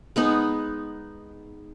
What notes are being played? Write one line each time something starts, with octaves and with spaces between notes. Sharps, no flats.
G#3 B3 D#4